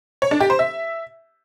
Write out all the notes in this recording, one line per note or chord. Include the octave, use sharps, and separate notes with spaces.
C#5
D4
G4
C5
E5